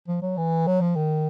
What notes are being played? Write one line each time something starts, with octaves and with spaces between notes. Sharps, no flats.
F3
F#3
E3
F#3
F3
D#3